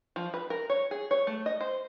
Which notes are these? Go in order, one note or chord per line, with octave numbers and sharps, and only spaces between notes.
F3
B4
A#4
C#5
G#4
C#5
A3
D#5
C5